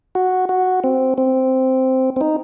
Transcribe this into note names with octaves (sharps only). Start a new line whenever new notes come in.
F#4
F#4
C4
C4
C4
D#4